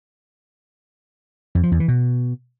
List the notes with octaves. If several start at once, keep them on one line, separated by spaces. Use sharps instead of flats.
F2
F3
E2
E3
B2